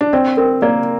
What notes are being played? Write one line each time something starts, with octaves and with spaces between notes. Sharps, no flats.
D4
C4 D5
C4 A#4
A#3 D5